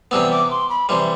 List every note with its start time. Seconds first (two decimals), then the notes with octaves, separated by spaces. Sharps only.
0.11 C3 E3 G3 B3 E6
0.31 D6
0.51 C6
0.69 B5
0.89 C3 E3 G3 C6